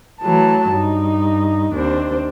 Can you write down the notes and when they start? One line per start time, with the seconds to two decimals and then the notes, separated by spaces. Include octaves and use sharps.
0.23 E3 F#3 A3 A5
0.70 G2 D#4
1.74 D#2 C4 D4 C5